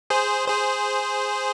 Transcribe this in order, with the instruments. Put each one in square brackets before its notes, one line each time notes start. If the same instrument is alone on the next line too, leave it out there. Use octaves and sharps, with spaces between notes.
[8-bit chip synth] G#4 C5
G#4 C5